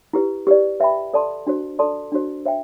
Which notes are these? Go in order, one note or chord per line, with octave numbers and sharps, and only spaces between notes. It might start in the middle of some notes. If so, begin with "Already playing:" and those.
E4 G4 B4
G4 B4 D5
B4 E5 G5 B5
A4 D5 A5 C6
D4 F#4 C5
A4 D5 A5 C6
D4 F#4 C5
C5 E5 G5